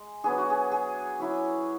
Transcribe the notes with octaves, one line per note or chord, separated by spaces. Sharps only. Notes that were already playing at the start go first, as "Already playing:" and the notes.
Already playing: G#3
F#3 B3 D4 G#4
F#4
G#4
G#4
F#3 C#4 E4